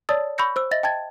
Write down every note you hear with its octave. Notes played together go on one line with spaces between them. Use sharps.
C#5 D5 A5 D#6 E6 A6
B5 C#6 E6 G6 A#6 C#7
C5 E6
D#5 E5 A6 A#6
G5 A5 G#6 A6